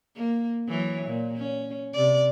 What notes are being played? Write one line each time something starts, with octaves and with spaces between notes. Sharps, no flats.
A#3
E3 F#3 C#5
A#2
C#4
C3 D5